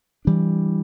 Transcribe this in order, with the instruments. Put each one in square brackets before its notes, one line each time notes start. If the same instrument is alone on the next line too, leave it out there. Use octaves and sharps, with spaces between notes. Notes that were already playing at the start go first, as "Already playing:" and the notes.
[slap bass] E3 G3 D4